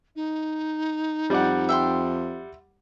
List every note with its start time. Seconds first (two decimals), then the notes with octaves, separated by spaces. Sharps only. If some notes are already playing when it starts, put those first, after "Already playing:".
0.16 D#4
1.30 F2 G3 D5 F#5
1.69 E5 G5 C6